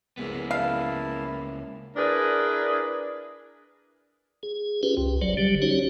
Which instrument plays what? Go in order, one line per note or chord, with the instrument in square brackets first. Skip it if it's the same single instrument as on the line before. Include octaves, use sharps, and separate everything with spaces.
[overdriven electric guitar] C#2 B3 [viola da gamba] A#3 E4 G#4
[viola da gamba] A#3 [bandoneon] E4 A5 [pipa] F5
[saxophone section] D4 E4 G#4 A#4 B4 D5
[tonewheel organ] G#4
C#4 F4 G4 G#4 B4
C2
F#1 F#3 C5 D5
D3 F#3 G3 G4
C#4 D#4 F#4 G4 C5 C#5